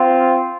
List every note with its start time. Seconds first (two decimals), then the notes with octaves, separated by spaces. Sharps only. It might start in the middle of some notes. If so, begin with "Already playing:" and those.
Already playing: C4 F4